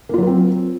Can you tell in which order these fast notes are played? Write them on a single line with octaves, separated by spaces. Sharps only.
A#3 F4 F#3 A#4 C4